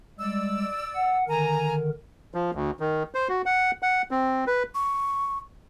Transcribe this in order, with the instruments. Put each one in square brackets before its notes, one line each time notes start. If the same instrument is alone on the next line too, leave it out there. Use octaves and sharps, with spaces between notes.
[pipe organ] G3 G#3 [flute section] D5 E6
[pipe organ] F#5
[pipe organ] D3 D#3 A#4 [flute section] G#5 A#5
[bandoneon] F3
D2
D#3
C5
F#4
F#5
F#5
C4
B4
[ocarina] C#6